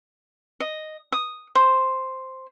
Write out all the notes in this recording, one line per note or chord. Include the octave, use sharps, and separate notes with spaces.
D#5
D#6
C5